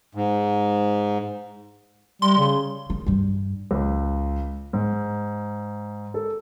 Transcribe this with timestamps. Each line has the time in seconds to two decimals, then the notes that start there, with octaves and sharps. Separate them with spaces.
0.15 G#2
2.22 G3 C6
2.38 C#3
2.90 D#3
3.06 G2 G3
3.71 C#2
4.73 G#2
6.14 A4